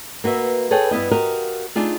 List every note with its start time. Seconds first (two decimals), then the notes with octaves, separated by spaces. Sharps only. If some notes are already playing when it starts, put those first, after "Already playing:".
0.24 A#3 F#4 B4 E5
0.71 G#4 A4 B4 C#5 G5
0.91 G2 B3 E4 D#5
1.11 F#4 G4 A#4 D#5 F5
1.75 A3 D4 D#4 F4 G#4